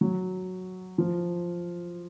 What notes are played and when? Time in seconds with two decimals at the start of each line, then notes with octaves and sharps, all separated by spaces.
0.01 F#3
0.98 F3